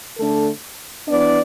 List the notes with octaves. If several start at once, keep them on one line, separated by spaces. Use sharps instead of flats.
D3 A3 D4 A4
E3 B3 D4 D5